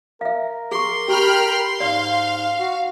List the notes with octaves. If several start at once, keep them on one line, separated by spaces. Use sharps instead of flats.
A#4 E5 F5
G#4 C6 C#6
G4 G5 B5 F6
G#2 D5 F5
F#4